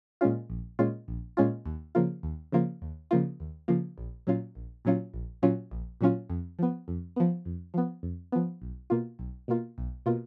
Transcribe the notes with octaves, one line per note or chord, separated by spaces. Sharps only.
A#2 G#3 C#4 F4
A#1
A#2 G#3 C#4 F4
A#1
A#2 G#3 C#4 F4
D#2
C#3 F3 A#3 F4
D#2
C#3 F3 A#3 F4
D#2
C#3 F3 A#3 F4
D#2
C#3 F3 A#3 F4
A#1
A#2 F#3 C#4 F4
A#1
A#2 F#3 C#4 F4
A#1
A#2 F#3 C#4 F4
A#1
A#2 F#3 C#4 F4
F2
F3 B3
F2
F3 B3
F2
F3 B3
F2
F3 B3
B1
B2 A#3 F4
B1
B2 A#3 F4
B1
B2 A#3 F4